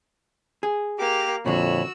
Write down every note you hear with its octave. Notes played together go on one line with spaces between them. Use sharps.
G#4
A#3 G4 D6 F7
F2 A#2 D3 F#4 C#5 B5 E6